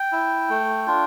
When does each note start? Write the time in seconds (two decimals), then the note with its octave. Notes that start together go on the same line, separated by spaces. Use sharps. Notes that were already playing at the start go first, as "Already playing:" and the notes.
Already playing: G5
0.12 E4
0.49 A3
0.87 D4 F4